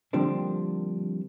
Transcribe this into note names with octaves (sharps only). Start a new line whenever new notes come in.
D3 F3 G3 A#3 C4 D4